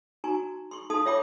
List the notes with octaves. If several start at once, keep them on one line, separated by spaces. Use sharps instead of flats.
D#4 F#4 G#5 A#5 C#6
C6 C#6
D#4 A4 F5 A5 C6 D#6
F4 C#5 E5 G5 B5 D6